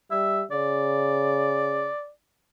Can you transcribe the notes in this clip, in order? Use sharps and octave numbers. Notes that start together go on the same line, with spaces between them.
G3 E5
C#3 D5